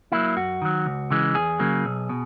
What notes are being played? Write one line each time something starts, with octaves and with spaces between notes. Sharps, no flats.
F#3 A#3 E4
F#2 F#4
D#3 F#3
C#2
C#3 E3 G#3
E2 G#4
C#3 F#3 A#3
B1
B2